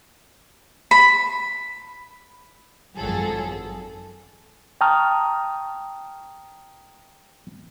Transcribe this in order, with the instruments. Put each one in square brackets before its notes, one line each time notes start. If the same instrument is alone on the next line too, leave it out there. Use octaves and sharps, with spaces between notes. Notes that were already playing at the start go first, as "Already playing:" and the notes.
[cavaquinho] B5
[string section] G#1 F#2 F3 F#3 G#4 A4
[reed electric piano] G5 A5 A#5 C#6 D#6 F6